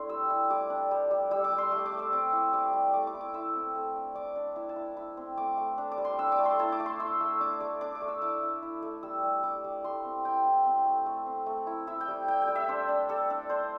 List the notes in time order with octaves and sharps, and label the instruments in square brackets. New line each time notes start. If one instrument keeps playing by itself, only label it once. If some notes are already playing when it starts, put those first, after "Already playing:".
Already playing: [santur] A3 C4 D4 E4 C6
G3 E6
E4
G3 D6
D4
G3
G3
G3 E6
D6
G3
C6
A3 D6
D6
A3
E6
C4 D6
E4
G3 D6
G3
A3 D6
D6
E4
D6
E4 E6
C4
A3
D4
D4 D6
D4
E4 A5
A5
E4
E4
C4
A3 D6
A3
D4
D6
G3
C6
D4 E6
D6
A3
C6
E4 A5
D6
A3
C6
E4 E6
A3
D4 D6
A3 D6
D4 D6
D6
A3
E6
E4 D6
E4
E4
A3
G3 E6
G3
G3 D6
G3
A3 C6
C4
E4 G5
E4
C4
A3
A3
C4
A3
E4
E4 E5
G5
G3
G3 G5
G5
G3
E5
D4 C5
D4
G3 A4
D4
D4 C5